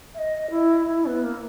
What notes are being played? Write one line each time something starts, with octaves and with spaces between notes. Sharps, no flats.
E5
D#5
E4
E4
B3
A#3